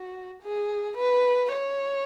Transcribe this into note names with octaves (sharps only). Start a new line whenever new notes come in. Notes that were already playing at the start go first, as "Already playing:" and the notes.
Already playing: F#4
G#4
B4
C#5